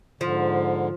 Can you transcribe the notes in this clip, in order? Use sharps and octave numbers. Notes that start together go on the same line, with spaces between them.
G#2 D3 F3